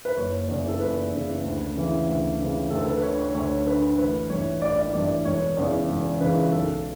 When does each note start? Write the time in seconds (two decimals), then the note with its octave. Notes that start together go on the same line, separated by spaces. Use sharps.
0.05 B4
0.17 F#1 C#5
0.48 E2 C#3 E3
0.68 A4
0.80 F#1 B4
1.12 E2 C#3 E3
1.44 D2
1.75 C#3 E3
2.08 D2
2.40 C#3 E3
2.70 D2 A4
2.81 A4
2.87 B4
2.97 B4
3.03 D3 C#5
3.18 C#5
3.34 D2 C#5
3.66 D3 B4
3.98 A1 B4
4.30 G2 E3 C#5
4.61 A1 D5
4.76 D5
4.90 D5
4.94 G2 E3
5.04 D5
5.25 E1 C#5
5.57 E2 C#3 E3
5.89 E1
6.20 E2 C#3 E3 B4
6.52 B1 A4